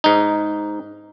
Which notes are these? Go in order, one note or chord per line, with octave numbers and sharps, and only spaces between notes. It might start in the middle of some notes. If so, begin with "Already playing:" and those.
G#2 D#4